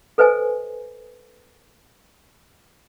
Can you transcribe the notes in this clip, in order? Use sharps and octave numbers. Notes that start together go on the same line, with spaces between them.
A4 B4 C5 D#5 G#5